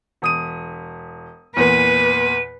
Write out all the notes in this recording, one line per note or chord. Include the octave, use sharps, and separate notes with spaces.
E1 D#6 D#7
E2 A#2 B4 D#7